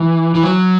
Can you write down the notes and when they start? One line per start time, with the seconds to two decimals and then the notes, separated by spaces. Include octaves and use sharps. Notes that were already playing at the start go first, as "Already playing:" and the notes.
Already playing: E3
0.35 E3
0.43 F#3